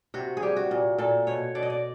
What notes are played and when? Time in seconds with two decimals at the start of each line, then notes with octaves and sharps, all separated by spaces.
0.14 C3 F#4
0.37 G#4
0.42 G3 G4
0.57 F#4
0.71 A#2
0.98 A#2 A4
1.27 B2 C#5
1.55 B2 D5
1.63 D#5
1.70 D5